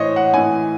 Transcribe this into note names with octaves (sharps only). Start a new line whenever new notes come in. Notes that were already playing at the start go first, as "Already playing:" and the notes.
Already playing: A2 E3 C5 C#5 D#5
F#5
A2 E3 G#5